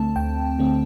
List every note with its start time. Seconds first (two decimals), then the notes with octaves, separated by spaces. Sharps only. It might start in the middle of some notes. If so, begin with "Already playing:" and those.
Already playing: D2 D3 A3 C4 A5
0.16 D2 G5
0.59 D3 A3 C4